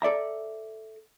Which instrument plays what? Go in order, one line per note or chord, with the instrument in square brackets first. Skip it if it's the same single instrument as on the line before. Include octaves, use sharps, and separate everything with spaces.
[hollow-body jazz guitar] A4 D5 E5 A#5